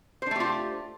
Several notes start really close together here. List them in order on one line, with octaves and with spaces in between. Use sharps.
C5 D4 A3 G4 F4